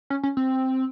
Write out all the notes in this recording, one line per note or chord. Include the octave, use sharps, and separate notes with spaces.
C#4
C#4
C4